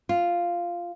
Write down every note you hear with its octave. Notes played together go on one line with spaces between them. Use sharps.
F4